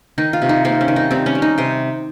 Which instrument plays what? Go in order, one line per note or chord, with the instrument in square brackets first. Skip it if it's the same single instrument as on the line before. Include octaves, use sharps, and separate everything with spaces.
[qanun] D#3 D#4
F4
C3
D#4
A#3 C4
C#4
D#3
D#4
G3 C4
C#4
G3
D#4
C3 C5